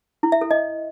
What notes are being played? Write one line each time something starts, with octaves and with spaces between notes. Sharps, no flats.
E4
E5
A4
D#5